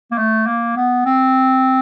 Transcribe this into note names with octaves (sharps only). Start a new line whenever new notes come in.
A#3
A3
A#3
B3
C4